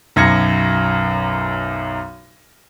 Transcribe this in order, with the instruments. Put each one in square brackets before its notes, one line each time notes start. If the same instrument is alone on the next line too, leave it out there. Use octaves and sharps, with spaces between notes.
[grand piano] B1 F#2 G#6 A#6 C#7